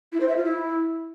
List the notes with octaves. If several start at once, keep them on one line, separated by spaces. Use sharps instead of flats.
E4
C5
E5
F4
E4